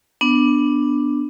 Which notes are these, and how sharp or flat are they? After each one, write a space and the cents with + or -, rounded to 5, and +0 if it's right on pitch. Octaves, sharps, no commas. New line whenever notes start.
B3 +0 D4 +0